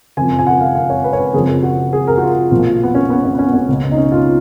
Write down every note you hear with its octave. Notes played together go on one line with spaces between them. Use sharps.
F#1 F2 F3 G#5
G#5
F#5
F5
F5
C#5
B4
C#5
B4
F#1 F2 F3 G#4
F#4
G#4
A#4
F#4
F4
B1 A#2 F3 F4
B3
C#4
B3
C#4
B3
C#4
B3
C#4
C#2 B2
D#4
C#4
F4